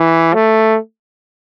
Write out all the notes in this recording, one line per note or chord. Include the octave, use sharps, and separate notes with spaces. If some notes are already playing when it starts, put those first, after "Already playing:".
Already playing: E3
A3